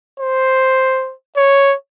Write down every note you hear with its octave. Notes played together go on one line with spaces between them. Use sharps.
C5
C#5